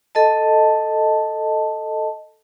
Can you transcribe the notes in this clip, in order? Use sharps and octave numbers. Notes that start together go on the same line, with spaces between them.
A4 D#5 A5